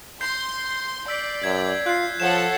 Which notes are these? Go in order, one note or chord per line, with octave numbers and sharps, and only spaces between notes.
C6 G6 C7
D5 E6 B6
F#2 G#6
F4 F#6 C7
F3 A4 C#5 F#5 G#6 E7